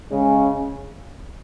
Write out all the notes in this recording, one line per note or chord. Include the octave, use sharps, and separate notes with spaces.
C#3 G#3 C#4